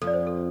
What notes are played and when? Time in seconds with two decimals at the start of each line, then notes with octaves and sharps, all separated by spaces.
0.02 F2 A4
0.07 D5
0.13 C5
0.27 A4